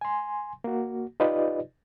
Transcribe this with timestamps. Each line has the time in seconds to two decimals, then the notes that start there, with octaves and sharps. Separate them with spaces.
0.01 G#5 C6
0.64 A#3 F#4
1.20 D#4 F4 G4 B4 D5 D#5